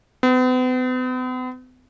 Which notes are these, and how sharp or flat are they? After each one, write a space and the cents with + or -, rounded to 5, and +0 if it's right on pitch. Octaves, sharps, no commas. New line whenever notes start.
B3 +45